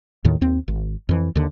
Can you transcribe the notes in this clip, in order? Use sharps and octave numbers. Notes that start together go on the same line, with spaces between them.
D#2 A2 D#3
D#2 C4
G#1
F2 E3
D#2 D3